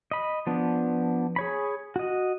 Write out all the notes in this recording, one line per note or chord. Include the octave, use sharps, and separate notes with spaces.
D#5 B5
F3 B3 D4
G#4 C#5 B5
F#4 D#5